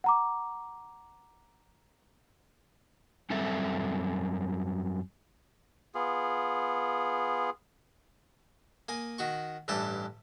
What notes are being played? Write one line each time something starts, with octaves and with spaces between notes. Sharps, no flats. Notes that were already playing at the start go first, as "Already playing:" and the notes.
F#5 A#5 D6
F#2 G3 C4 A4 E5
B3 F4 G#4
A#3 G#5 D#6
D#3 F#4 C#6
A1 G2 E3 G4 A5 D6